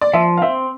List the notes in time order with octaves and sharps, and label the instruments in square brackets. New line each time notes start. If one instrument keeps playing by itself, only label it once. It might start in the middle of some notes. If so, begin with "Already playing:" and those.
[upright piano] D5
[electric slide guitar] F3 [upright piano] E5
[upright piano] F5
[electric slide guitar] C4 [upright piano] E5